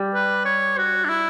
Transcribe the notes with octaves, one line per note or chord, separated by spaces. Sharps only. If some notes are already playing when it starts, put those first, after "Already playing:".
Already playing: G3
B4
C#5
F#4
D4
E4